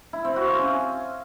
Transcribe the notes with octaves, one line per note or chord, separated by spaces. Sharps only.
E4
C4
F#4
F5
C#4